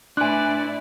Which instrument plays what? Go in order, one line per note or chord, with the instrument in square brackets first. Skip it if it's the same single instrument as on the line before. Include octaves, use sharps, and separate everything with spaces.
[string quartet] A2 E4 D5 [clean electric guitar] D4 B4 [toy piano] G#5 C6 [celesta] F#6